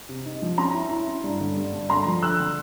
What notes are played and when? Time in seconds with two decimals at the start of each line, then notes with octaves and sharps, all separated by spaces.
0.09 C3
0.25 D#4
0.42 F3
0.58 C#4 A#5 C6
0.74 E4
0.91 E4
1.07 C#4
1.24 G2
1.40 D3
1.57 G2
1.73 G2
1.90 D3 A#5 C6
2.06 F3
2.22 D3 E6 F#6
2.39 D3